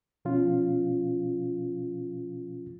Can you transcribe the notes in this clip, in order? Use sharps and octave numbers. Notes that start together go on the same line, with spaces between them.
B2 F3 C#4 F4